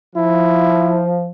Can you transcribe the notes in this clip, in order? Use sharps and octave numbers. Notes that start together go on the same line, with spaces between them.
F3 E4